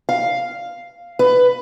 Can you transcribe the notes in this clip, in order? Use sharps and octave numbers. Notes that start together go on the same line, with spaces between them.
F5
B4